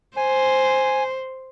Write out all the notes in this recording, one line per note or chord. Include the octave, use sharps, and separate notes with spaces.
C5 G#5